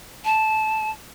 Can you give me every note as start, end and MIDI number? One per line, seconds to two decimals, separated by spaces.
0.25 0.90 81